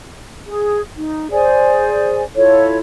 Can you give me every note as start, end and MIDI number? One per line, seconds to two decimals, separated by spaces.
0.47 0.81 68
0.96 1.30 63
1.31 2.23 68
1.31 2.23 72
1.31 2.23 74
1.31 2.23 80
2.36 2.79 64
2.36 2.79 65
2.36 2.79 69
2.36 2.79 73